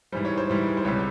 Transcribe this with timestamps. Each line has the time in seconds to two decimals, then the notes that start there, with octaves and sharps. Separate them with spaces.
0.12 G#2 E3 G3 C5
0.25 C#5
0.38 C5
0.50 G#2 E3 G3
0.77 C5
0.85 C#2 C#5
0.87 C3 G3